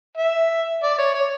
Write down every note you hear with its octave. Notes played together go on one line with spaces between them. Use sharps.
E5
D5
C#5
C#5